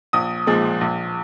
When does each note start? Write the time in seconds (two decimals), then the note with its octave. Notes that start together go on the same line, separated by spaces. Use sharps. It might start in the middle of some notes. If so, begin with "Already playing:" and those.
0.13 A#1 D#6
0.47 A#2 F3 G#3
0.81 A#1